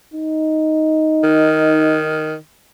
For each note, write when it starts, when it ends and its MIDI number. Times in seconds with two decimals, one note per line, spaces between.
0.14 2.20 63
1.23 2.36 51